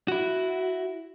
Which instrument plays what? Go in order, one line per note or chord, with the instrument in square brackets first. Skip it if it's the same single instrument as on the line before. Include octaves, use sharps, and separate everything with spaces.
[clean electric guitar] E4 F#4